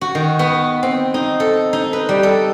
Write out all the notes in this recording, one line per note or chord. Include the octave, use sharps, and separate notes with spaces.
F#4
D#3
B3
C4
D#4
A4
D#4
B4
G3
A4